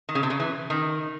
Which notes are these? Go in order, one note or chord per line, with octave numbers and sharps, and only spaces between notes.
D#3
C#3
C3
C#3
E3
D#3